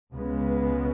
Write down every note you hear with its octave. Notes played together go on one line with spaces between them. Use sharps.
C#2 C#3 G#3 B3